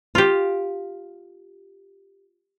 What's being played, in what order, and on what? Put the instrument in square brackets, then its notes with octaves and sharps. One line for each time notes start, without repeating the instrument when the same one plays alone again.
[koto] F4 G4